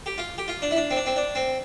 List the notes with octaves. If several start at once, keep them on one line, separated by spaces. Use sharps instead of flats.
G4
F4
G4
F4
D4
E4
D4
C4
D4
C4
D4
C4